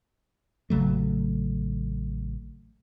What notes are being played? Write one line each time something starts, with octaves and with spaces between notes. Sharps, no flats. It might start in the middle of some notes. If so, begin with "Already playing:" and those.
A1 C#3 F#3 A3